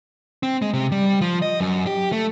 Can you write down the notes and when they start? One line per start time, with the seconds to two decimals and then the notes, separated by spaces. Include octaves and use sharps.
0.43 C4
0.62 G#3
0.74 C3
0.92 G3
1.21 F3
1.42 D#5
1.60 F#2
1.87 G4
2.12 A3